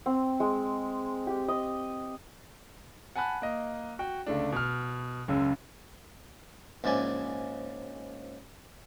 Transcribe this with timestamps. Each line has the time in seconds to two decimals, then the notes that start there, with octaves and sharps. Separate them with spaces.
0.06 C4
0.40 G#3
1.27 G4
1.48 D#5
3.16 F#5 G#5 A5 B5 F#6
3.42 A#3 D#5
3.99 F#4 G5
4.26 C#2 D3 A3 D4
4.52 B2 F6
5.28 F#1 C#2 F#2 E6
6.84 A#1 G#2 C#3 D5 G#5